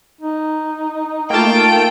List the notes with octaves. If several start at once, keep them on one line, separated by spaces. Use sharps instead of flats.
D#4
A3 A#3 F4 G5 A5